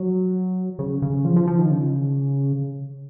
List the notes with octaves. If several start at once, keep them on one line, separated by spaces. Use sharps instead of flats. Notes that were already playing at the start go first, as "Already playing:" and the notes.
Already playing: F#3
C#3
C#3
F3
F3
F3
D#3
C#3